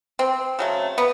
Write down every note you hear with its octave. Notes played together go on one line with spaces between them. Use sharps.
C4
C#3 F#3 A3
B3